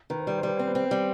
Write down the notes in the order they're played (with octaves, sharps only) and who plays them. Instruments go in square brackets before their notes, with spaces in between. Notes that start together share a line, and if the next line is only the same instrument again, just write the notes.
[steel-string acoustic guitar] D#3 [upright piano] B4
[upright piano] C5
[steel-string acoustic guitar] G3 [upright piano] B4
[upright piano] C5
[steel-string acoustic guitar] G3 [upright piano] B4
[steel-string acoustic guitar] C4 [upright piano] C5
[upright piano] B3 B4
[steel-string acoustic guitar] C4
G3